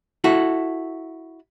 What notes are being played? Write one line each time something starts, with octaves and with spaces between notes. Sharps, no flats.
E4 F#4 A4